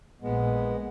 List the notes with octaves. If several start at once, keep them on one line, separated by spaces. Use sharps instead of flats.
A#1 A#2 G#3 B3